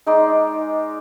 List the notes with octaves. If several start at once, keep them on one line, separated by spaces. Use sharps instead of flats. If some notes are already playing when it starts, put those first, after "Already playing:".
G#3 D#4 D5 C6